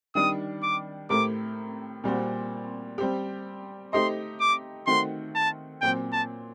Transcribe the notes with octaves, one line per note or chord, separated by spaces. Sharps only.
D#3 G3 D4 D#6
D6
A2 A3 C4 G4 A#4 D6
A#2 G3 C4 F#4 C5
G3 C4 G4
A3 D#4 G4 C5 D#5 C6
D6
D#3 A3 C4 F#4 C6
A5
A#2 F#3 C4 G5
A5